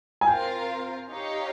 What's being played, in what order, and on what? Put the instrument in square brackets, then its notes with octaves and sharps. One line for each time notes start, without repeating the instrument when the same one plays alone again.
[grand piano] G#5
[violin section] C4 F4 A#4 F5 [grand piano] G5
[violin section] D#4 G4 C#5 F5